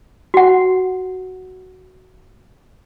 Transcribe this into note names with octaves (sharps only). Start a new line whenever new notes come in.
F#4 F#5